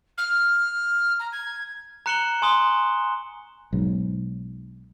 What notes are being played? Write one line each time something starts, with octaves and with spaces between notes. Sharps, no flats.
F6
A#5
G#6
A#5 F#6 C#7 E7 F#7 G7
G#5 C6 C#6 D#6 E7 G7
B1 G#2